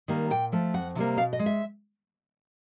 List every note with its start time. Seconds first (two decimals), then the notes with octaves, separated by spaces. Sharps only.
0.08 D#3 G3 A#3
0.30 A#2 G5
0.52 F3 A3
0.74 F2 F#5
0.95 C3 E3 G3 A#3
1.17 B2 F5
1.33 D#5
1.39 G#3
1.46 E5